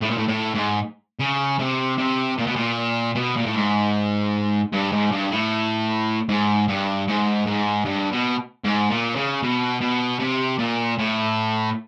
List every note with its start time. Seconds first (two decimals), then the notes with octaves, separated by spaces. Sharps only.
0.02 A2
0.11 A#2
0.18 A2
0.28 A2
0.55 G#2
1.20 C#3
1.59 C3
1.98 C3
2.38 A#2
2.47 B2
2.56 A#2
3.15 B2
3.37 A#2
3.46 A2
3.54 G#2
4.72 G2
4.92 G#2
5.12 G2
5.31 A2
6.29 G#2
6.68 G2
7.08 G#2
7.46 G#2
7.85 G2
8.12 B2
8.64 G#2
8.90 A#2
9.16 C#3
9.42 B2
9.81 B2
10.20 C3
10.59 A#2
10.99 A2